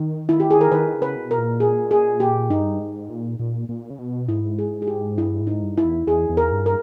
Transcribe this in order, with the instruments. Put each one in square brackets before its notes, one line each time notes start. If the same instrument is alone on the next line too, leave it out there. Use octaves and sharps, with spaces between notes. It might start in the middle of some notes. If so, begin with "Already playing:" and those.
Already playing: [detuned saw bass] D#3
[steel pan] E4
G4
G#4
A#4
[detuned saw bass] D#3 [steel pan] B4
[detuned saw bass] C#3
[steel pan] B4
[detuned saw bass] B2
[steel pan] A#4
[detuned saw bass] A#2
[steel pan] G#4
G#4
G4
[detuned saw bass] G2 [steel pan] D#4
[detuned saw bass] G#2
A#2
A#2
A#2
C#3
B2
[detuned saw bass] G#2 [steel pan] E4
[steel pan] G#4
G#4
G4
[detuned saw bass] G2 [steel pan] E4
[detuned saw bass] G#2
[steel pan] D#4
[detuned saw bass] G2
[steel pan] E4
[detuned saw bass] E2
[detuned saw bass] E2 [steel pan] G#4
[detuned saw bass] E2
[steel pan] A#4
[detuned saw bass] G2
[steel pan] A#4